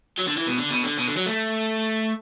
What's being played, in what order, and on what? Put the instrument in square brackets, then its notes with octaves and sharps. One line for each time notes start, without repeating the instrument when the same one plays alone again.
[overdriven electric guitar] F#3
D3
E3
B2
D3
B2
D3
B2
D3
F#3
A3